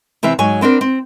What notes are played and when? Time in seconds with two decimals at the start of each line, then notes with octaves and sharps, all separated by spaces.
0.23 C3 E3 C4 E5
0.39 G#2 F#3 C#5 G#5
0.61 B3 C4 D4 A#4
0.81 C4